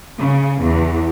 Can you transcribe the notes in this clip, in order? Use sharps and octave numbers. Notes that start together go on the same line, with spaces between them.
C#3
E2